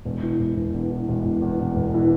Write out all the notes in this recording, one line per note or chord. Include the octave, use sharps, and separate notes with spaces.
E1
E3
E1
E1
E2
E3
E1
E1
E2
E1
E1
E3